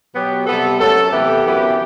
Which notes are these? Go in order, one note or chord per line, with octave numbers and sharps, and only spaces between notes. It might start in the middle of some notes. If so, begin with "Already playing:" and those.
B2 F#3 B3 G4
C3 G3 B3 A4
F#2 F#3 A3 A4
C3 E3 B3 G4
F#2 E3 B3